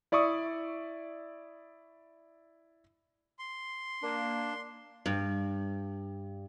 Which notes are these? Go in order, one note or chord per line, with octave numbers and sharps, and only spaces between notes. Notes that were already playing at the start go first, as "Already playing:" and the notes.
E4 D5 E5 C#6 D#6
C6
A#3 D4
G2